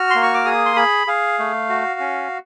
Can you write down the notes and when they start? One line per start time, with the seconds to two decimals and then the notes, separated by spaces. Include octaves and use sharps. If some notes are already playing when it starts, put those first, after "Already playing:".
Already playing: F#4 F6
0.10 A#3 C6
0.23 C#6
0.34 D6
0.45 G#4 D#6
0.66 C6
0.76 G#4 B5
1.07 G#4 F5
1.39 A3
1.69 F#4
2.00 C#4